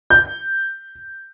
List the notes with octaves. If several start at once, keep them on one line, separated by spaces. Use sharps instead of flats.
G6